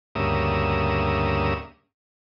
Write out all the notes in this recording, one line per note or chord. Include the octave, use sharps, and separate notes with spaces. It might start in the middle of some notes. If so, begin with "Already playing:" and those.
D2 G2 C#3 A#3 E5 D#6